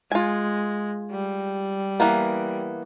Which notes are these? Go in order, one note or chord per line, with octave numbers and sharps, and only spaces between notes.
G#3 F4 G#5
G3
E3 A#3 B3